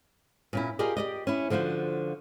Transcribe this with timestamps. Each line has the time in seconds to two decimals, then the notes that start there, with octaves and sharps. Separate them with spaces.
0.53 A#2 C#4 E4
0.79 F4 G4 G#4 A#4 D5 D#5
0.97 G4 D5 D#5
1.27 C#4 E4
1.50 D3 F3 F4 F#4 C5